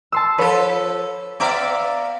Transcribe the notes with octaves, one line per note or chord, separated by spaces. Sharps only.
A5 C6 E6
F3 A4 B4 C#5
B3 D5 E5 F5 A#5 D6